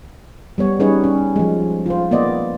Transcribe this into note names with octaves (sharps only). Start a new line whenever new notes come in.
G3 B3 C#5
G3 C#4 D#4 G#4 B4 C#5
C#4
F3 G#3
F4 C5
A#3 B3 C5 D5 D#5